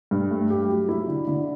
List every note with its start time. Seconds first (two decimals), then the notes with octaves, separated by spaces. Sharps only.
0.11 G2
0.31 A3
0.50 G4
0.70 F#3
0.89 E4
1.08 D3
1.27 D3